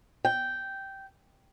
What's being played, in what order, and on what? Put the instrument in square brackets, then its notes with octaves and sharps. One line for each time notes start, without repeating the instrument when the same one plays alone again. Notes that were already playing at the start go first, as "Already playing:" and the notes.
[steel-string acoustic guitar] G5